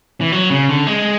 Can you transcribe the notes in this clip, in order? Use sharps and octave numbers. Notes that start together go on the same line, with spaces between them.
E3
F#3
C#3
D3
G#3